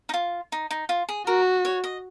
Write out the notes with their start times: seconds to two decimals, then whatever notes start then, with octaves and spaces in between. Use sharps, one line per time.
0.09 D#4
0.14 F4
0.52 D#4
0.70 D#4
0.89 F4
1.09 G#4
1.26 F#4 A#4
1.65 C#5
1.84 D#5